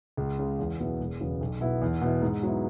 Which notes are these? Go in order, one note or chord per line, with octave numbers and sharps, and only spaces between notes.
C#2
C#3 G#3
E2
B2 F#3 B3 E4
E1
E2 C#3 F#3 B3
B1
B2 B3 E4
E2
B2 B3 E4
G#2
F#3 B3 E4